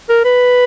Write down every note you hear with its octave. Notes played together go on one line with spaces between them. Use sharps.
A#4
B4